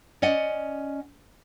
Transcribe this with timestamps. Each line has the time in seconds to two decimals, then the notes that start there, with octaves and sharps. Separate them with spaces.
0.22 C#4 D5 D#5 F#5